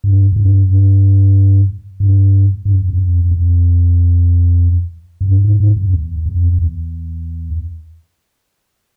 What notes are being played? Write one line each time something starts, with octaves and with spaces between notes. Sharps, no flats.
G2
F#2
G2
F#2
G2
G2
G2
F#2
F2
F#2
F2
F2
F#2
G2
G#2
G#2
F#2
E2
F2
E2